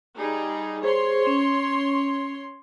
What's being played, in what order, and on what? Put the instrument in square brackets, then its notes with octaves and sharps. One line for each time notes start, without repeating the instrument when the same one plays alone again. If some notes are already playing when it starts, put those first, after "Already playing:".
[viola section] G3 D#4 G#4
[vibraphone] G#4 C5 [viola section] C#5 C6
[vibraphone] C#4